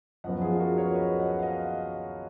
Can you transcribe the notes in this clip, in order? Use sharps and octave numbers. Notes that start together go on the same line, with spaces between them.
F#2 F3 B3 D#5 F#5
F4 G#4
F#4 A#4
B4
A#4 C#5
B4 D#5
D#5 F#5
F5
D#5 F#5